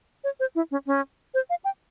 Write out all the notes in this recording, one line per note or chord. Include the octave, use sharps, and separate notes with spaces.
C#5
C5
E4
C#4
C#4
C5
F5
G5